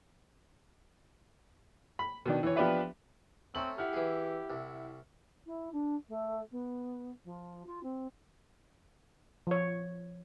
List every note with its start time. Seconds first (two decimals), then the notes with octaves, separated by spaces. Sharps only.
1.99 B5
2.26 B2 D#3 D4
2.43 E3 C#5
2.56 F3 B3 D4 G4 B4 E5
3.55 A3 C4 C#4 D#4 F#7
3.78 E4 G4 F#5 F6
3.93 E3 G#4
4.50 C2
5.46 E4
5.72 D4
6.08 A3
6.51 B3
7.24 F3
7.66 F4
7.83 C4
9.47 F3 C#5